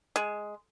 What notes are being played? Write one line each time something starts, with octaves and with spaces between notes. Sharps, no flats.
G#3